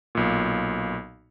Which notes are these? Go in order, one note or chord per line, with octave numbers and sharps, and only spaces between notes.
B1 A#2